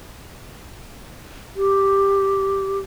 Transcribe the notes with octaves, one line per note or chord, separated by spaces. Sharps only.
G4